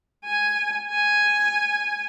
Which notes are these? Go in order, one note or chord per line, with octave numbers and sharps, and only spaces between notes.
G#5
G#5